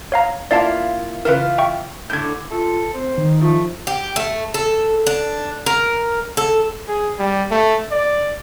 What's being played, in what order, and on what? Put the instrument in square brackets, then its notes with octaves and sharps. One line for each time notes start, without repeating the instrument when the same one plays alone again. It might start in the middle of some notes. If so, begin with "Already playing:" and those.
[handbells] C#5 F5 A#5
[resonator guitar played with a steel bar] A#3 E4 F4 [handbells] D5 F5 A5
[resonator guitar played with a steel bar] C#3 E3 F4 [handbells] A#4 B4
[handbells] E5 G5 C#6
[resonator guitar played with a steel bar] A2 D3 [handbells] G6 G#6
[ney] F4 [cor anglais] A4
[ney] C4 [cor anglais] C5
[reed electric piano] D#3 [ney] D#4
[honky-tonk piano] F3 [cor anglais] A3
[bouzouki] G4
A3
A4
D4
A#4
A4
[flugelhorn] G#4
G3
A3
D5